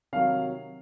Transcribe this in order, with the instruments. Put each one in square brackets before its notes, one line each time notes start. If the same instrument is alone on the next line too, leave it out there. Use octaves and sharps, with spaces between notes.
[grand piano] C3 D#3 F#3 F5